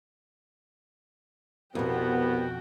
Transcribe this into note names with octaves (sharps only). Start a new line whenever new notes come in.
C2 F2 B2 B3 F#4 G5